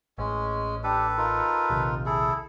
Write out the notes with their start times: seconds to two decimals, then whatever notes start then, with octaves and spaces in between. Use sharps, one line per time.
0.18 A1 G#3 C#4
0.84 D4 G4 A4 B4
1.17 D#4 F4 A#4
1.70 A#1 D#2 C3
2.06 E4 G#4 A4